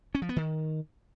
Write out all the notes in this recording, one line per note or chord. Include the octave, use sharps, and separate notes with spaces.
C#4
F3
B3
D#3